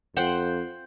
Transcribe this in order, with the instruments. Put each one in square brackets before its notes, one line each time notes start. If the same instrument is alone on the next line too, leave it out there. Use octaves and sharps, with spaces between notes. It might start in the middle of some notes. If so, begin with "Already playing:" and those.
[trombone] F2 [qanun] C5 F#5 G5